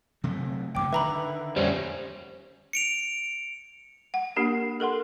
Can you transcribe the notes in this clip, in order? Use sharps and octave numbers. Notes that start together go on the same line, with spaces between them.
C3 F#3 A3
F#1 D2 D3 G5 D6
D3 D#3 B4 E5 A#5 B5
F2 G3 C#4 C5
C#7 D7 F7
F#5
A#3 D4 G4 A#4
A4 A#4 F#5 C6